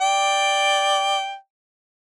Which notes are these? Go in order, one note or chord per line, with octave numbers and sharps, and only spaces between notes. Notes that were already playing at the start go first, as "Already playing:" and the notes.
D5 G5